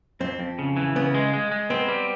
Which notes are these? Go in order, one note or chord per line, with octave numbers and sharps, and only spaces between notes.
F2 C4
F2
C#3
E3
C#3 B3
G#3
G#3
G#3
B3 C4
G3